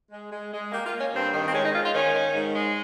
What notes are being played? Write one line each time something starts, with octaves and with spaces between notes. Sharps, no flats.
G#3
G#3
G#3
A#3 G4
F4
A#3
C#4
G2 C4
D#3
C4
G#3 C#4
D#4
G#2 F4
F4
D#3 C#4
D#3
G#2
G#3